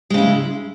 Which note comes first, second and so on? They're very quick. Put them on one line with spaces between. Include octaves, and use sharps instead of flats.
G#3 C#3 E4